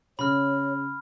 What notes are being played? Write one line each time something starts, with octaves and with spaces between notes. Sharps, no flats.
C#3 C#5 B5 F6